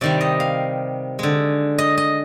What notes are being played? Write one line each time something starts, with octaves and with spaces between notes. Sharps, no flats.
C3 D#3 G3 D5
D#5
F5
D3 G#3
D#5
D#5